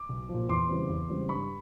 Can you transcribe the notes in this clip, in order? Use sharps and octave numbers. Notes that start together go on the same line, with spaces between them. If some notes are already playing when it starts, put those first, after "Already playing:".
Already playing: D6
B1
F3
A#2
E2 C6 D6
C#3 E3 G3 C4
E2
C#3 E3 G3 C4
G2 B5 C#6